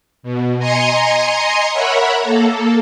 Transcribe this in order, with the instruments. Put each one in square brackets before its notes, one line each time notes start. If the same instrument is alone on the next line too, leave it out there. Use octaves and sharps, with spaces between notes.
[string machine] B2
D#5 G#5 A#5 C6 D#6 C#7
A#4 C#5 E5 F#5 B5
A#3 A4